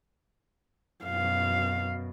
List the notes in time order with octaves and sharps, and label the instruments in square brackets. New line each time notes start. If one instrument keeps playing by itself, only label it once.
[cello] F#2 B2 [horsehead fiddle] F5